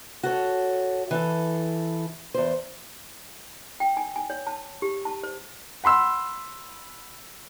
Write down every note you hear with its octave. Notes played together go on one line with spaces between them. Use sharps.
F#4 A4 C#5
E3 A4
E2 C5
G5
G#5
G#5
C#5
A5
G4
A5
C5
F#5 B5 C6 E6